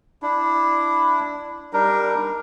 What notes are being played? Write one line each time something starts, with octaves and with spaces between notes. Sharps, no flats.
D4 E4
G3 D4 D#4 A#4